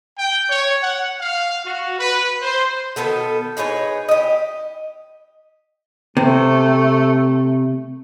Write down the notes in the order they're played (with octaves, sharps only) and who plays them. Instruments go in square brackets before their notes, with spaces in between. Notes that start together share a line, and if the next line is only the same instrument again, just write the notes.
[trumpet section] G5
C#5
F#5
F5
F#4
B4
C5
[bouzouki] B2 D#3 B3 A4
D#4 G#4 B4 C#5
G4 D#5
[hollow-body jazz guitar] C3 [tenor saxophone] A3